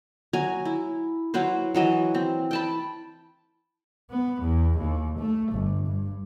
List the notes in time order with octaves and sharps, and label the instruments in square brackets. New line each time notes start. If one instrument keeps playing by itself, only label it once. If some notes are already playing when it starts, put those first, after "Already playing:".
[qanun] F#3 G#5 A#5
E4
F#3 E4 B4 C5
E3 F#3 D#5 E5
C4
G5 A5 B5
[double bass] B3
E2
D#2
A3
G1
G2